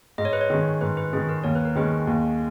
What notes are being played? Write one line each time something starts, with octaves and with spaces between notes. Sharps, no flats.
G#2 D#5
C#5
B4
C#5
D#3 G#3 C#4
G#2 B4
B4
D#3 G#3 C#4 G#4
A#4
D#2 C#5
B4
A#4
D#3 G#3 C#4 B4
D#2